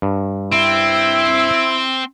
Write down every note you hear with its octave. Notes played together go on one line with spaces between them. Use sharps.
G2
C4 E4